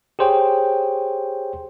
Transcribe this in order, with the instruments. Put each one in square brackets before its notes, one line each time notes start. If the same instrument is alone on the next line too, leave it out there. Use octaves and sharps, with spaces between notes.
[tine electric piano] G4 G#4 C5 C#5 G5